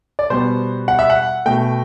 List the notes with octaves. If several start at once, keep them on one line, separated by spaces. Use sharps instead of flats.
D5
B2 G3 B3 C5
F#5
E5
F#5
B2 A3 G5